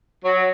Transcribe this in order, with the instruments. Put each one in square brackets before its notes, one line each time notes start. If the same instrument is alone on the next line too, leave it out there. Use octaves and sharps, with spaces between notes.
[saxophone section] F#3